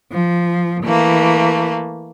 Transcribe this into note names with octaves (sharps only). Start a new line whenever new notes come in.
F3
E3 A3 A#3